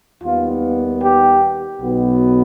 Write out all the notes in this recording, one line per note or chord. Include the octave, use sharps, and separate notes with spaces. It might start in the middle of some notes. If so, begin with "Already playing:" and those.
D#2 D#3 G3 B3 F4
G4
B1 B2 B3